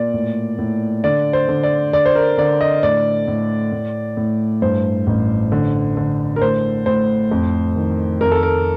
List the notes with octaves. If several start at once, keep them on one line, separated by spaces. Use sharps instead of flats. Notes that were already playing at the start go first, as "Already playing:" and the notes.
Already playing: A#2 D5
A2
A2
D3 D5
C5
D3
D5
D3 D5
C5
A#4
D3 D5
D#5
A2 D5
A2
A2
A2
G2 C5
A1
D3
D3
A#4
A2 C5
A2 C5
F2
D#3
F2 A#4
A4
A#4